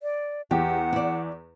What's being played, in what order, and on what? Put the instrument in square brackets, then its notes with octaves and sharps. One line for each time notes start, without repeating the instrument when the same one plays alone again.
[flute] D5
[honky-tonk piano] E2 [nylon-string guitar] G4 [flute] F#5
[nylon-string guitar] E4 D5